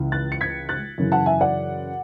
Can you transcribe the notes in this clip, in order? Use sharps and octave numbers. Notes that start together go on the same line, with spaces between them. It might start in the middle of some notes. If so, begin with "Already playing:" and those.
Already playing: C#2 C#3 E3
F#6 A6
C#7
G#6 B6
F#6 A6
F#2 C#3 E3
F#5 A5
E5 G#5
D5 F#5